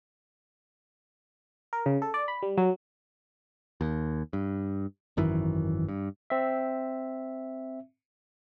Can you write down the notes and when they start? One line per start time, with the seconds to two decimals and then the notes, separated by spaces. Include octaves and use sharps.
1.73 A#4
1.86 C#3
2.02 A4
2.14 D5
2.28 B5
2.43 G3
2.57 F#3
3.81 D#2
4.33 G2
5.17 G#1 F#2 D#3 E3
5.88 G2
6.30 C4 E5